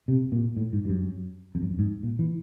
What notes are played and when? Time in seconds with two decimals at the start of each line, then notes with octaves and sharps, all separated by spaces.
0.08 C3
0.32 A#2
0.57 A2
0.73 G#2
0.85 G2
0.89 F#2
1.55 F2
1.62 F#2
1.70 F2
1.79 G#2
2.03 A#2
2.19 E3